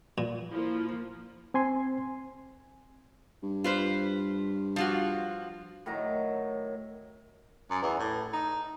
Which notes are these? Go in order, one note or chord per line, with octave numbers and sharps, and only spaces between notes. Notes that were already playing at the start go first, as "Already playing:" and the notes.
A#2
F3 A#3 E4
C4 G#5 C6
G2
F4 B4 C5
F3 F4 F#4
A2 D#3 F#3 A#5
F#2
E2
A2
D#4